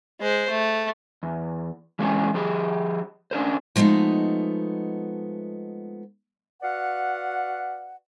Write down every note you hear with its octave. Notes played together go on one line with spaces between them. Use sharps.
G#3 C5
A3
E2
E3 G#3 A#3 C#4 G#4
F3 G4 G#4
C#4 D4 A#4 C5
F3 G#3 A3 B3 D#4
F#4 B4 D5 F5 F#5